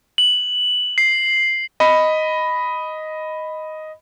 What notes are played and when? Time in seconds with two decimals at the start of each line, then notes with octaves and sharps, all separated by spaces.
0.18 F#7
0.98 C7
1.80 D#5 B5